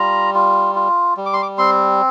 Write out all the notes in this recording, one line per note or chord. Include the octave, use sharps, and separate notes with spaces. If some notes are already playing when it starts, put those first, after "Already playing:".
Already playing: G3 F4 A#5
F4
F4
G3
D6
C6
D6
C4 C6